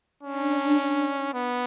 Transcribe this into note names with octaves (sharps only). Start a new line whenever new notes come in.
C#4 D4
B3